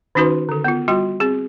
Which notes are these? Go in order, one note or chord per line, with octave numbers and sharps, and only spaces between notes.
D#3 C#4 D#4 F#4 B4 C6
D3 A4
B3 F4
G3 F4 F#4 G5 C6
C4 G#4